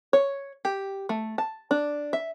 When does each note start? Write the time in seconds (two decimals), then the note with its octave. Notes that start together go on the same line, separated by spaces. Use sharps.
0.13 C#5
0.65 G4
1.09 A3
1.38 A5
1.71 D4
2.13 E5